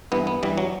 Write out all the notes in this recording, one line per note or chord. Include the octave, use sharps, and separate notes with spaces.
G2 E3 B3
B3
G2 E3 G3
F#3